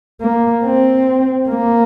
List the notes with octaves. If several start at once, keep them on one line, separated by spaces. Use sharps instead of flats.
A#3
C4
A#3